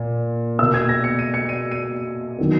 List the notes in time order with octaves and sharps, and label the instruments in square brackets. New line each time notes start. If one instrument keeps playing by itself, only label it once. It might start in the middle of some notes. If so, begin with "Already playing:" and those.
Already playing: [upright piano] A#2
B2 A#3 E6
G#6
A#6
C#7
D#7
C#7
D#7
D#7
D#3 F#3 B3